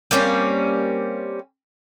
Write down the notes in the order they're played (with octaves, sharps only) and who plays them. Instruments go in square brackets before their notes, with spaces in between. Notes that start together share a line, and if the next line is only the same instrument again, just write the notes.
[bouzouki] G3 A#3 C4 C#4